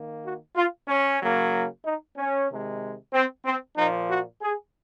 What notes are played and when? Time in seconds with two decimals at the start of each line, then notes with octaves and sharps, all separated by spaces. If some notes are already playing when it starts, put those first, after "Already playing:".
Already playing: D#3 A#3
0.24 F#4
0.56 F4
0.88 C#4
1.20 C#3 F#3 A#3
1.85 D#4
2.17 C#4
2.49 C3 D#3 G#3
3.13 C4
3.45 C4
3.77 A#2 F3 A#3 D#4
4.09 F#4
4.42 G#4